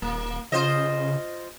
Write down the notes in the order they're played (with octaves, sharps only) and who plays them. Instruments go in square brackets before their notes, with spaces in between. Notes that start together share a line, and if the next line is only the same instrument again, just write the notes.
[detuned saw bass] D#1 [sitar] A#3
[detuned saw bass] C#3 [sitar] F4 C5 D#5